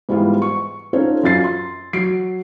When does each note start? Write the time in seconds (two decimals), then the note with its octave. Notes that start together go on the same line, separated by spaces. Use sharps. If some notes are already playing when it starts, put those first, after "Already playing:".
0.09 G#2 E3 G3 G#3 B3 F4
0.42 C#6
0.93 C#4 D#4 F4 A4 C5 C#5
1.23 F#2 F4 A6 C7
1.44 C6
1.93 F#3 C7 D7